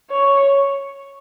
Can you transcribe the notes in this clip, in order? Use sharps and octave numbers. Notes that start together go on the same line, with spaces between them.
C#5